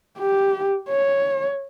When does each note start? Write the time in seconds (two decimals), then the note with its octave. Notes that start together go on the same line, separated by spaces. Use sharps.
0.19 G4
0.90 C#5